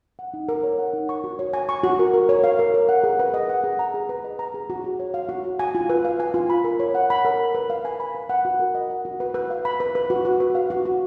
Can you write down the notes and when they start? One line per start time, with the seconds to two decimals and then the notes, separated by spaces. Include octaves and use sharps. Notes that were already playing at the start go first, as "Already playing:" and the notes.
0.19 F#5
0.34 D#4
0.49 A#4
0.63 C#5
0.79 F#5
0.93 D#4
1.09 C#6
1.24 F#4
1.39 C#5
1.54 G#5
1.69 C#6
1.84 F#4
1.99 A#4
2.14 A#4
2.29 C#5
2.44 F5
2.59 A#4
2.74 A#4
2.89 F#5
3.04 G#4
3.19 B4
3.34 D#5
3.50 F#5
3.64 G#4
3.79 A#5
3.94 G#4
4.09 B4
4.24 D#5
4.39 A#5
4.54 G#4
4.70 F#4
4.84 F#4
5.00 C#5
5.14 F5
5.29 F#4
5.44 F#4
5.59 G#5
5.75 F4
5.90 B4
6.05 F5
6.20 G#5
6.34 F4
6.50 B5
6.64 A#4
6.80 C#5
6.95 F#5
7.10 B5
7.25 A#4
7.39 B5
7.55 B4
7.70 F5
7.85 G#5
8.00 B5
8.15 B4
8.30 F#5
8.45 F#4
8.60 A#4
8.75 D#5
8.90 F#5
9.05 F#4
9.20 B4
9.34 B4
9.50 F5
9.65 B5
9.80 B4
9.95 B4
10.10 F#4
10.25 F#4
10.40 B4
10.55 F5
10.70 F#4
10.85 F#4